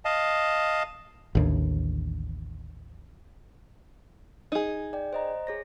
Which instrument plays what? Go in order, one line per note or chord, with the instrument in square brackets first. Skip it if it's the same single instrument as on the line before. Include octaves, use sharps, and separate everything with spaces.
[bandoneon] D#5 F5 A5
[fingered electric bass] A1 D#2 D3
[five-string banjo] D#4 G#4
[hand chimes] D5 G5
C5 D#5 A#5
G#4 C#5 A#6